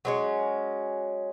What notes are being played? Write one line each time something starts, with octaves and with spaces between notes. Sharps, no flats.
F#3 G#3 C#4